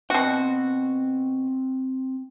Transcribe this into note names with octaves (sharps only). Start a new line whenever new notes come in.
B2 C4 F#4 G5